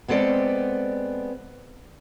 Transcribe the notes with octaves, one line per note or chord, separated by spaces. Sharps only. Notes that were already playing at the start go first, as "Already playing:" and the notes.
G#3 B3 C4 A4 D5